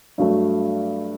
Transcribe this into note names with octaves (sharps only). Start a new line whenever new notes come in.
G2 F#3 A3